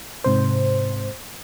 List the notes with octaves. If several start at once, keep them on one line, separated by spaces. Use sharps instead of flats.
G#2 C3 C5